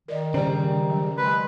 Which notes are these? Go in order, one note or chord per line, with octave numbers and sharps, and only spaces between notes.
D#3 A#4 D5 D#5
C#3 G3 C5 D5 A#5
D#3
F#3
G#3 A#4 B4